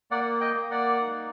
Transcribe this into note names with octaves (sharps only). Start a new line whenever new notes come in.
A#3 D5 F#5
D#5 G5
A#3
D5 F#5
D#4